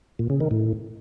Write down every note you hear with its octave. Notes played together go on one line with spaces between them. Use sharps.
A#2
C#3
D#3
A2